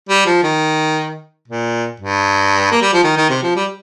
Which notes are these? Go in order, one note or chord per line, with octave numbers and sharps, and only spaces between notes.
G3
F3
D#3
A#2
G2
A#3
G3
F3
D#3
D#3
C3
F3
G3